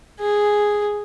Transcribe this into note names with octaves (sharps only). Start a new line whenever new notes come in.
G#4